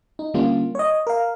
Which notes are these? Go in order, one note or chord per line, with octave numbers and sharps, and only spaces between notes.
D#4
D3 G3 A#3 C#4 F4
C#5 D#5
A#4 F5